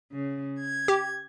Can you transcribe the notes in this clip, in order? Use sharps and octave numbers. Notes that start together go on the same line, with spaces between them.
C#3
G#6
G4